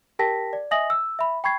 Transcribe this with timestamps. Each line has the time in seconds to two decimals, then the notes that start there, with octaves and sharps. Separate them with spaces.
0.19 G4 A#4 G5 A5 A#6 B6
0.53 D5
0.71 D#5 E5 G#5 D#6 A#6 F#7
0.90 E6
1.19 E5 B5
1.44 G5 B5 C#6 G#6 C7